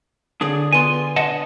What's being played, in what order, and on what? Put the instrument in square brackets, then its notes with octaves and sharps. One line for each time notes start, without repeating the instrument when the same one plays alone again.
[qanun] D3 C#5 D5 [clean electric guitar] D4 G#4
[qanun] B3 C6 [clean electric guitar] F4 G#5
[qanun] D4 C#5 [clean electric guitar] D#5 F#5 A5